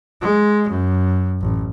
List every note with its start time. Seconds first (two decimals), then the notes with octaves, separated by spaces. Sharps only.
0.21 G#3
0.69 F#2
1.41 A1